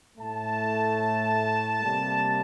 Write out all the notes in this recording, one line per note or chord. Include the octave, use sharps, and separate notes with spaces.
A2 A3 A5
C3 G3 A#3